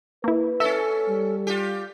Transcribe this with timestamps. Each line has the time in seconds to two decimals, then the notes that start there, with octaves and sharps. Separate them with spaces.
0.24 A#3 E4 B4
0.60 C#4 A4 E5
1.10 G3
1.47 F4 G4